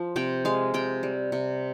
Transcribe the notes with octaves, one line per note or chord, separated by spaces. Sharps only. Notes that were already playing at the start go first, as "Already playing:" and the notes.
Already playing: F3
C3 G5
G#3 F5
C3 G5
G3
C3